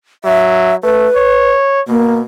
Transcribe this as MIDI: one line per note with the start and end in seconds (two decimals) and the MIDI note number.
0.24 0.75 54
0.24 0.76 76
0.83 1.08 57
0.83 1.50 71
1.15 1.81 73
1.88 2.25 47
1.88 2.16 58